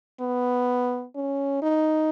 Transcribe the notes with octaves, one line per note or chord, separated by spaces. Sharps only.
B3
C#4
D#4